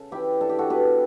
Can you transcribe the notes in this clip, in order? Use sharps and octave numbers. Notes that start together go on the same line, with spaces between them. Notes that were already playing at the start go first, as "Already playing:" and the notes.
Already playing: C#3 C#4 A4
E3 E4 G4
D4 A4
G4
F#4 A4
B3 G4 B4